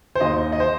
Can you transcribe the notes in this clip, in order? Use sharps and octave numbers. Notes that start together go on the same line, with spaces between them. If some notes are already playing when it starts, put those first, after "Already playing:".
C5
D#2 D#5
D#5
C5